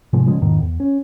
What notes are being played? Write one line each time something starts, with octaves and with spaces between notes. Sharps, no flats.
G#2 C3 F3 G#3
C#3 F3 G#3
E2 G#2 D#3
E2
C#4